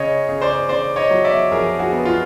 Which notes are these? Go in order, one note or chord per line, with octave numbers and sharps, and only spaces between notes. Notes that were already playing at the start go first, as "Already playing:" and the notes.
Already playing: C#3 C#5 D#5
C#3
C5 D5
C#3 C5 D5
C#5 D#5
F#3
D5 E5
F2 G#4 A#4
F#4 G#4
B3
F4